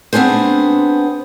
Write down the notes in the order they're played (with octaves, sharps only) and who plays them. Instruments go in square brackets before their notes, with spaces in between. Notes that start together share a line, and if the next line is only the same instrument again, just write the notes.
[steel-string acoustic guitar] B3 C4 D4 G#4 C5